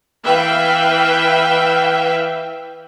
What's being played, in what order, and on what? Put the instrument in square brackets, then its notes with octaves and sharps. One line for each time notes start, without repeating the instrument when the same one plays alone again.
[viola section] E3 B4 E5 F5 G5